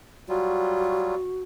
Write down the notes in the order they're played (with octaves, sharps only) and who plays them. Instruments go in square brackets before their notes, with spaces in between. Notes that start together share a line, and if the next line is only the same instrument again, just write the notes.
[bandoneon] F#3 G3 F4 [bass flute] F#4